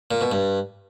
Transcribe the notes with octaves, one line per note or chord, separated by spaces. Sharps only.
A#2
B2
G2